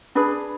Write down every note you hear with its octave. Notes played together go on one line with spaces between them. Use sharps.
D4 G#4 B4 B5